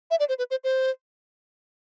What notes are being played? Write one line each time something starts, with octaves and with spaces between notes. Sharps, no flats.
E5
D5
C5
B4
C5
C5